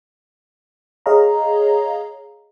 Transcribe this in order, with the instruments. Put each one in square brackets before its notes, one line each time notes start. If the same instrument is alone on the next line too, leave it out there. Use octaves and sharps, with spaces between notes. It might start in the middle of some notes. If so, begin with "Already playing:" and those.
[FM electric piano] G#4 C#5 D#5 F5 A#5